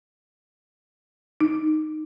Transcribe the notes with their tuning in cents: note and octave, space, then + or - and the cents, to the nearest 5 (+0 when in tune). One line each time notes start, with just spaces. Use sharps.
D#4 -10